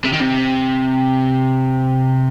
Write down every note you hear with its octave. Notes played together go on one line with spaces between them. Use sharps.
C3
D#3
C3